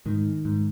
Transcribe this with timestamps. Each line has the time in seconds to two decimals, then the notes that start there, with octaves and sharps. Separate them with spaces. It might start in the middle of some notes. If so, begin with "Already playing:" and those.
0.06 G#2 D#3
0.45 G#2